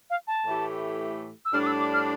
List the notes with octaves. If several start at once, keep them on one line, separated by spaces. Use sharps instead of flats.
F5
A5
A2 E3 A3 E4 G4
E6
A2 G3 D4 F6
D6
E6
D6
F6